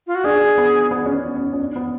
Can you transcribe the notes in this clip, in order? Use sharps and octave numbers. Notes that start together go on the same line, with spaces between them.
F4
F#4
D4 G#4
B3
B3
C#4
B3
C#4
C#4
D4
B3